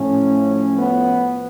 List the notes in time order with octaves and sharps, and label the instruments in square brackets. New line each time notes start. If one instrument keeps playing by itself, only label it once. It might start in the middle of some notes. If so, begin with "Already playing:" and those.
Already playing: [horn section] A2 F3 C#4
B3